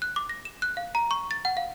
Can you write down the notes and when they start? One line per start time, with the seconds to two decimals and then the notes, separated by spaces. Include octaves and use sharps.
0.02 F#6
0.16 D6
0.29 A#6
0.45 E7
0.62 F#6
0.77 F5
0.95 A#5
1.11 C#6
1.31 A6
1.45 F#5
1.57 F5